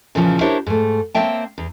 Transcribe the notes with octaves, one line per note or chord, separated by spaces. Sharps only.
A#2 C#3 E3 F3 C#4
D4 E4 G4 A#4 C5 C#5
G#2 A3
A#3 C4 C#5 E5 G5 A5
E2